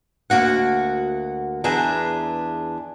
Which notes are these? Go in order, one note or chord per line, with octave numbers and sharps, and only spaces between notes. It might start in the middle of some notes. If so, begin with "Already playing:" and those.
D2 A#3 F#4 F#5
E2 D4 G#4 B4 E5 A#5